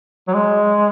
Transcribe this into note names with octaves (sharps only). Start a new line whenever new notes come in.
F#3
G#3